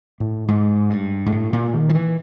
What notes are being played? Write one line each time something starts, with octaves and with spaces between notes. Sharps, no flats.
A2
G#2
G2
G#2
A2
A#2
D#3
F3
E3